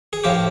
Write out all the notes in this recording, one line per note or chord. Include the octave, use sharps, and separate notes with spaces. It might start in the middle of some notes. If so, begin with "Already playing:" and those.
G#4
A2 F3 F4 G4